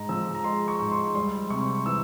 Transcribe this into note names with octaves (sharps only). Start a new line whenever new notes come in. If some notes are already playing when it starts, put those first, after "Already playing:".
Already playing: G#2 A#5
F3 E6
A#5
G#3 C6
C#6
G#2
C6
G3 C6
C3 C#6
E3 E6